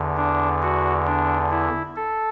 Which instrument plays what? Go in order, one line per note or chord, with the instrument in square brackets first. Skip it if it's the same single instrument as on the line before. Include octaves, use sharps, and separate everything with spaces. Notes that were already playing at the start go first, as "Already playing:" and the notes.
Already playing: [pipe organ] E2 D3
D4
F#4
D4
E4
A4